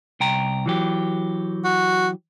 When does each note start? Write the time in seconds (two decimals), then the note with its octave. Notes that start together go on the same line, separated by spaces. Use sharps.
0.20 C2 G5 A#5
0.66 E3 F#3 G4
1.64 F#4